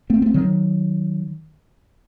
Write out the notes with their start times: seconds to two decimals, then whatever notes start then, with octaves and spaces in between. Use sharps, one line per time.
0.10 A3 C4
0.22 A3 C4
0.34 D#3 F#3